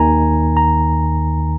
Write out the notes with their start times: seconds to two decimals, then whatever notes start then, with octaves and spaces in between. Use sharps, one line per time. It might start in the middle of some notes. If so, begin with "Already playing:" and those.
Already playing: D#2 D#3 G#5 A#5
0.57 A#5